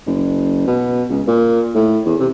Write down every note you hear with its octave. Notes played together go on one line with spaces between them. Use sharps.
F#1
B2
C#2
A#2
A2
E2
C3